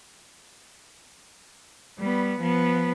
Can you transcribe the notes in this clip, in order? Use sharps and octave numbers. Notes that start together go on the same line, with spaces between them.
G3 B3
F3 B3